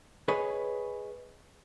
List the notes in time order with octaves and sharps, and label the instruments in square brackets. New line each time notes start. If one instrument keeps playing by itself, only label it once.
[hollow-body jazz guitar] G#4 B4 C#5 D#5 G#5